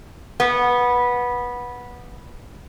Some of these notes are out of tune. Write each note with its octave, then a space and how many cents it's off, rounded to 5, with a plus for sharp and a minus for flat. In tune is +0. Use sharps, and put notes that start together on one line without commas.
B3 -15